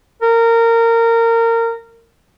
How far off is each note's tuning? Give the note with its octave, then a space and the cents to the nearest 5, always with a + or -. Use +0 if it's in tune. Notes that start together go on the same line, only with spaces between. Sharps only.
A#4 -20